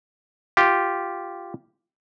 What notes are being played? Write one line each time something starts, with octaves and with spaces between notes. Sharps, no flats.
F4 G4